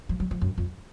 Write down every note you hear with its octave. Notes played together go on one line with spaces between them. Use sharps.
F3
F#3
F3
F#2
F2